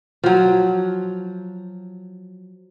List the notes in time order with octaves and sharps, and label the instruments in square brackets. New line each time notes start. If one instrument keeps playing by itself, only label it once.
[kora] F3 F#3